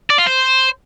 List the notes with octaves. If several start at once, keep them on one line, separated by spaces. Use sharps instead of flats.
D5
F4
C5